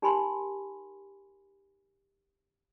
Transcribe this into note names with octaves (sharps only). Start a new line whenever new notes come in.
D#4 G4 A#4 G#5 B5 C6